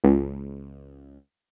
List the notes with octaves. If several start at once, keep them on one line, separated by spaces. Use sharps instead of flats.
C#2